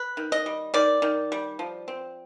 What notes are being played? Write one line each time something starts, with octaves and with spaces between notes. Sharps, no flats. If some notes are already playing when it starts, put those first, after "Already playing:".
Already playing: B4
D#3
D#5
G3
D#3 D5
D#3
G3
F3
C4